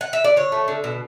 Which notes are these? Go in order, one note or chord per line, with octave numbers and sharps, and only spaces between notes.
F#5
E5
D5
D3 C#5
A3
D3
B2